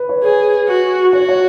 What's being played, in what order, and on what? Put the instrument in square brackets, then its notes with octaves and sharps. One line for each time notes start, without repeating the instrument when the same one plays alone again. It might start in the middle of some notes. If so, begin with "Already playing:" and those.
Already playing: [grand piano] B4
C#5
[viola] G#4
F#4
[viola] F#4 [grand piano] C#5
[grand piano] C#5